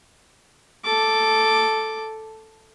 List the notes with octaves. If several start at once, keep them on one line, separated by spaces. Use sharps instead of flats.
A4 D6